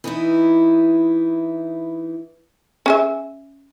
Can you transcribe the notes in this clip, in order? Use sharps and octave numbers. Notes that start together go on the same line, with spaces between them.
E3 B3 D#4 E4
C#4 G#4 E5